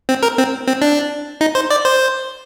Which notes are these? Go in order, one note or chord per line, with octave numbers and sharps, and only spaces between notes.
C4
A#4
C4
C4
D4
D#4
C5
D5
C5